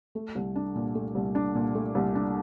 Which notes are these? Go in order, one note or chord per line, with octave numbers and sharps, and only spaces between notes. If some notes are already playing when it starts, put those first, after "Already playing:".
A3
C2
D4
A#2
A3
C2
D4
A#2
A3
C2
D4